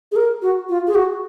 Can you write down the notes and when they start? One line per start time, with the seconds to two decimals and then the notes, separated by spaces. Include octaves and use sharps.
0.12 G#4
0.16 A#4
0.42 F#4
0.69 F4
0.87 G#4
0.95 F#4